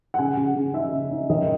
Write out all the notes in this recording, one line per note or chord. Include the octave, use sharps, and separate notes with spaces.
F#5
C#3 G#5
C#3
C#3
D#4 E5
C#3
D#4
D#3 D#5